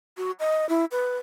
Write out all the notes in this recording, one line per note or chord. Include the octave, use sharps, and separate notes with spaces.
F#4
D#5
E4
B4